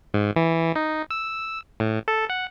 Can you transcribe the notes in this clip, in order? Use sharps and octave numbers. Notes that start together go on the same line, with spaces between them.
G#2
E3
D#4
E6
A2
A4
F#5